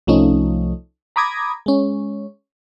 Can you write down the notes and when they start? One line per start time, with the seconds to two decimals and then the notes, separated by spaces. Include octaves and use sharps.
0.07 C2 F3 A3 C#4 D#4
1.16 A#5 B5 D6 D#6 G#6 A#6
1.66 G#3 C#4